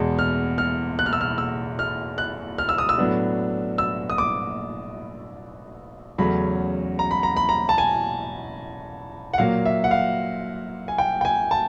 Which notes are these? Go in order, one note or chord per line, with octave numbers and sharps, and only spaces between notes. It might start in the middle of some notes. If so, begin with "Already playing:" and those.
Already playing: E2 B2 G#3
F6
F6
F#6
F6
E6
F6
E6
F6
F#6
F6
E6
D#6
E6
A2 F#3 B3 D4
E6
D#6
D6
E2 C#3 F#3 A3 C#4 B5
A#5
B5
A#5
B5
A#5
A5
G#5
F#5
A#2 F#3 A#3 F5
E5
F#5
F5
G#5
G5
G5
G#5
A5